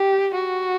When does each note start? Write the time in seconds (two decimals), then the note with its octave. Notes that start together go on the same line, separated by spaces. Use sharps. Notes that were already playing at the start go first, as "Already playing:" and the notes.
Already playing: G4
0.35 F#4